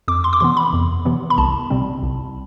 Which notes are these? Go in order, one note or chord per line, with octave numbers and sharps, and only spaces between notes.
F2 D6
C6
D6
C3 E3 B3 C6
B5
F2
C3 E3 B3
B5
C2 A5
C3 G3 C4
C2